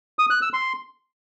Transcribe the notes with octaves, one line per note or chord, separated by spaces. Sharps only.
D#6
F#6
E6
C6